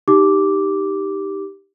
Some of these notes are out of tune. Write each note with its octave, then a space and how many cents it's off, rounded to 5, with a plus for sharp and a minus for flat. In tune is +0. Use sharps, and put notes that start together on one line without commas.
D#4 +0 G4 +0 D6 -5